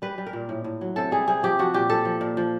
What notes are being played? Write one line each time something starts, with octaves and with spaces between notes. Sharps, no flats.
G3 B4
G3
A#4
A#2
A2
A2
F#3
C3 A4
G3 G#4
C3 G#4
F3 G4
F3 F#4
A#2 G4
F3 A4
F3
A#2
F3